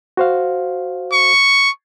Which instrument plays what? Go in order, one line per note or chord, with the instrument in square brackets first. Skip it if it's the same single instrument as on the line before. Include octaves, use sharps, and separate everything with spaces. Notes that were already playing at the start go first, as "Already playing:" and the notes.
[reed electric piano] F#4 C5 F5
[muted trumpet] C#6